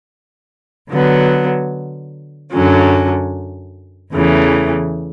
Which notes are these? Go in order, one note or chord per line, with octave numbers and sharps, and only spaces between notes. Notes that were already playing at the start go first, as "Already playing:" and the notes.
D3 F#3 B3
F#2 D3 F#3 C#4
E2 C#3 E3 A3